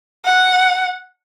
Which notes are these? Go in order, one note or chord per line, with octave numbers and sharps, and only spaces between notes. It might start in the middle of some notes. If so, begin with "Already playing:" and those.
F#5